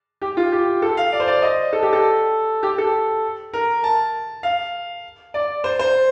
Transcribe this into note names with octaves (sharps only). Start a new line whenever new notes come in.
G4
F4
G4
A4
F5
D5
C5
D5
D#5
A4
G4
A4
G4
A4
A#4
A5
F5
D5
C5
C5